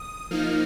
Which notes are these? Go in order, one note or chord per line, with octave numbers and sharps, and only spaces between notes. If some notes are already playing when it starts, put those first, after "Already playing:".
Already playing: D#6
F3 A#3 D#4 F6